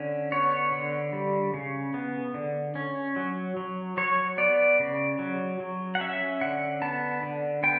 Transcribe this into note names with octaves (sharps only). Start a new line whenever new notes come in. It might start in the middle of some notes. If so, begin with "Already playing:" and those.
Already playing: D3 C#4
B3 C#5
D3
G3
C#3
B3
D3
C#4
F#3
F#3
F#3 C#5
B3 D5
C#3
F#3
F#3
F#5
C#4 E5
D3 F#5
B3 A5
D3
B3 G5